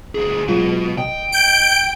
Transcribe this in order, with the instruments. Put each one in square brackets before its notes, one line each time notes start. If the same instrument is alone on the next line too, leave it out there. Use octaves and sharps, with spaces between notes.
[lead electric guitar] D2 G#4
[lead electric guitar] B2 [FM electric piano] F#3 G#3 F4
[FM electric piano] D#5 [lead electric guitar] G5
[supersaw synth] G6 D7